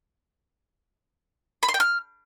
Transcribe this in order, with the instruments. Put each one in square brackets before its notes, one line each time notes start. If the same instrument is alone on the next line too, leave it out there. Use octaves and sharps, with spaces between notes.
[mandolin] B5
C6
G5
F6